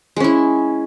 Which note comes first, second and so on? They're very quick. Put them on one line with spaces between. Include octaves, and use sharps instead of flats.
G#3 C#4 E4